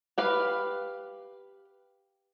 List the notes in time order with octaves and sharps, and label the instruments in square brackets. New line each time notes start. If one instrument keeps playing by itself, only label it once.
[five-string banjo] G4 B4 F5